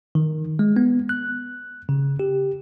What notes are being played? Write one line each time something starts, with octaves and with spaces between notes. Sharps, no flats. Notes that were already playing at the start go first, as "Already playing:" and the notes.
D#3
G#3
B3
F#6
C#3
G4